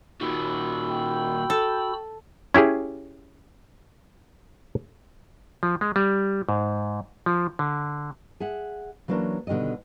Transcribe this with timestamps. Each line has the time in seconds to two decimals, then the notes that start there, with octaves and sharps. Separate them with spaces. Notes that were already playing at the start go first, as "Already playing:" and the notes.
0.21 A#2 D#3 F#4 B5 E6
0.91 G5
1.50 A4
2.54 C#4 E4 G4 G#4
5.63 F3
5.81 G#3
5.96 G3
6.49 G#2
7.26 F3
7.59 D3
8.40 G#4 E5 F#5
9.08 E3 F#3 A#3 C#4 D4
9.47 B2 D3 D#3 G3 D#5